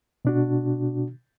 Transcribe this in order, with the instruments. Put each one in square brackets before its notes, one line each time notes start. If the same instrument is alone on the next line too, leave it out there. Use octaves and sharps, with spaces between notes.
[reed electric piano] B2 D4 F#4